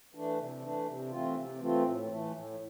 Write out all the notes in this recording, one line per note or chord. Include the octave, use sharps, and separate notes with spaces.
E3 A3 D4
C3
E3 A3 D4
C3
E3 A3 C4 F4
C3
E3 A3 C4 F4
A2
E3 A3
A2